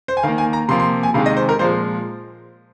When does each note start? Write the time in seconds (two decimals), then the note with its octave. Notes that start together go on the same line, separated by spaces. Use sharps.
0.08 C5
0.17 G#5
0.23 D#3 A#3 F5
0.38 G#5
0.53 A#5
0.68 C3 F3 A#3 C6
0.80 C6
1.03 G#5
1.14 C3 D#3 G#3 F5
1.26 D#5
1.37 C5
1.49 A#4
1.59 A#2 F3 G#3 C5